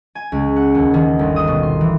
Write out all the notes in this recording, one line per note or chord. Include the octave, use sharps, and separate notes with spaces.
G#5
C#2
F#5
D#2
D#3
G1
D#6
B2
C6
E3